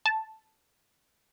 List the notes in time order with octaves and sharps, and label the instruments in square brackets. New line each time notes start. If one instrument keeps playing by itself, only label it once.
[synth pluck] A5